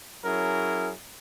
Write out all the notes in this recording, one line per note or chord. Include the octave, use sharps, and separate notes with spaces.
F#3 C#4 E4 G#4 A#4